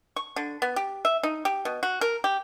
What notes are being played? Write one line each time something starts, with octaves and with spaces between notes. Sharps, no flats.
C#6
D3
B3
G4
E5
D#4
G4
B2
F#4
A#4
G4